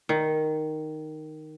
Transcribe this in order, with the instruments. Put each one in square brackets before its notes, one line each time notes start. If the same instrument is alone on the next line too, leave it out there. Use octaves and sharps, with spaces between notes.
[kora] D#3